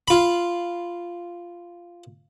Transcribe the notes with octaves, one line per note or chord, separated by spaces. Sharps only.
F4 B5